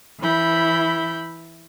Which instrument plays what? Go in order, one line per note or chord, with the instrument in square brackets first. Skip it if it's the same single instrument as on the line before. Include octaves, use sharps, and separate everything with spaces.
[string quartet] E3 E4 B5 G6